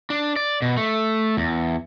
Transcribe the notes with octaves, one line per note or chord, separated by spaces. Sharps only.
D4
D5
B2
A3
E2